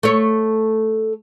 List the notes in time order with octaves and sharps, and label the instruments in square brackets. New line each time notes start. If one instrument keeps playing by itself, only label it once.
[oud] A3 C#5